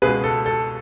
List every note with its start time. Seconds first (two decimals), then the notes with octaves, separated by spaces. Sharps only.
0.02 C#2 B2 G#3 G#4 B4
0.24 A4
0.46 A4